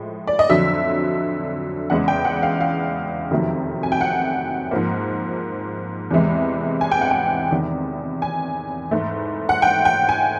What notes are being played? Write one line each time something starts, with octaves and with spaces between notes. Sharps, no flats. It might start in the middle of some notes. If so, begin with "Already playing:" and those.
Already playing: A2 F3 G#3
D5
D#5
F2 D3 F#3 E5
E2 C#3 E3 G#3 F#5
G5
F#5
F5
F5
F2 C3 D#3 F#3 A3
G#5
G5
F#5
G#2 F3 A#3
E2 C3 E3 G#3
G#5
G5
F#5
G5
E2 C3 D#3
G#5
G#2 E3 A3
F#5
G5
G5
G#5